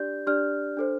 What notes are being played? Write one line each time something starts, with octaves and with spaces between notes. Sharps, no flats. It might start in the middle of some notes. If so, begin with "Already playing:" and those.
Already playing: D4 G4 D5 G6
D4 G4 D5 F6
D4 A4 C5